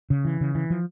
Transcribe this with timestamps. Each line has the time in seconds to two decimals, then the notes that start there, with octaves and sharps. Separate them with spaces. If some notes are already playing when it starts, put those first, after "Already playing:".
0.10 C#3
0.25 E3
0.41 C#3
0.55 E3
0.70 F3